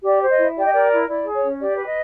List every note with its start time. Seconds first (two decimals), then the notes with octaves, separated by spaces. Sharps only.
0.03 G4 D5
0.21 C5
0.30 D#5
0.38 E4
0.55 G4 D5
0.65 D#5
0.73 A#4 D5
0.91 E4
1.07 E4 D5
1.25 G#4
1.34 C#5
1.42 C#4
1.60 G4 D5
1.76 B4
1.85 D#5